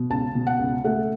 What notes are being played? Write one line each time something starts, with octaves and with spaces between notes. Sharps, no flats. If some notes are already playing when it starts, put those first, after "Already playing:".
Already playing: B2
C#2 A5
B2
F#5
C#2
A3 F#5